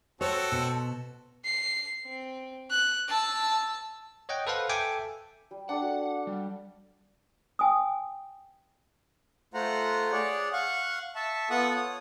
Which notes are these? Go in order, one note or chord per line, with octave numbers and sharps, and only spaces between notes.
C4 F#4 A4 C#5
B2
C7
C4
F#6
A5 E6
C#5 D#5 F#5 G5
A4 B4 C5 F5 F#5
A4 E5 G5 G#5 D6
G3
D4 A4 F#5
F#4
G3
G5 G#5 D#6
A3 F4 C5 F#5 A#5
G#4 C#5 D5 F#5
F5 F#5 C#6
E5 A5 C#6
B3 F4 A4 F#5 C#6 D#6
C#5 D#6